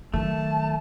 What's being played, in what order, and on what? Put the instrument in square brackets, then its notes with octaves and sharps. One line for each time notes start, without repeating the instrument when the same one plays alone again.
[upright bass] D#3 F#3 [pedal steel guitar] A3 [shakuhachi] A5